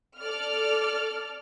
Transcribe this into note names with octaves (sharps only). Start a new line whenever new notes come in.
A4 D5 F6